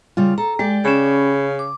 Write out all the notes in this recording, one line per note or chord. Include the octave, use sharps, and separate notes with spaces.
C#3 G3 F4
A4 A#5
G#3 G4 D5
C#3 C#4 B5
D6